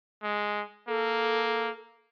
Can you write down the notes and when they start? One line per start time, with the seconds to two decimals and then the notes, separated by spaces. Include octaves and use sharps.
0.23 G#3
0.88 A#3 A4